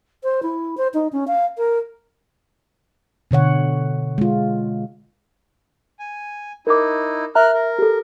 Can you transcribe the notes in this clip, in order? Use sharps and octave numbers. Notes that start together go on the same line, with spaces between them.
C5
E4
C5
D#4
C#4
F5
A#4
B2 D3 C#5 F#5
G#3 F4
G#5
D#4 E4 A#4 D6
A#4 E5 A#5 F6 F#6
A#4
G4 A4